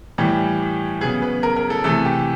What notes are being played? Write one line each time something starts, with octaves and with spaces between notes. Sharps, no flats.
A2 E3 G3 G4
C#3 F#3 B3 G#4
B4
A#4
A#4
A4
C3 E3 A3 A4
G4